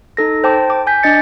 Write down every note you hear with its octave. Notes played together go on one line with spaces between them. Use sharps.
D#4 A4 A#6
C5 G5 A5 D6
D6
G#5 G6 B6
D4 D#5 A6 C#7